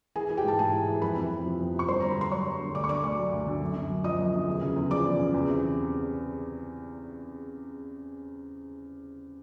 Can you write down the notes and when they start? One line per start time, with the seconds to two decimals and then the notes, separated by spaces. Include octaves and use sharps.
0.16 E3 G#4 G#5
0.30 E3
0.37 G4 G5
0.44 G#2 A5
0.59 G#2 G#4 G#5
0.73 E3
0.88 E3
1.02 F2 B4 B5
1.17 C3
1.31 F2
1.45 F3
1.60 F2
1.74 C3
1.79 C#6
1.88 G2 C5 C6
2.00 D3 A#5
2.11 B5
2.17 G2 C6
2.31 F#3 C#5 C#6
2.46 G2
2.61 D3
2.75 D2 D5 D6
2.84 C#6
2.89 D3 D5 D6
3.03 D2 D5 D6
3.18 F#3
3.32 D2
3.46 D3
3.61 F#2
3.76 D3
3.90 F#2
4.04 F3 D#5 D#6
4.19 F#2
4.33 D3
4.48 E2
4.61 C#3
4.76 E2
4.91 F3 D5 D6
5.05 E2
5.19 C#3
5.34 E2
5.48 C3